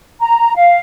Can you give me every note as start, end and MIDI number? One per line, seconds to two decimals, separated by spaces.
0.20 0.55 82
0.56 0.79 77